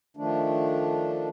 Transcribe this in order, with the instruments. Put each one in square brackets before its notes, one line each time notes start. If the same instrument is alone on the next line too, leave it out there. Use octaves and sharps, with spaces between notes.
[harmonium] D#3 F3 A3 D4